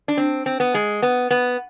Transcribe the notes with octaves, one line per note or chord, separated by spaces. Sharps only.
D4
C4
C4
B3
G#3
B3
B3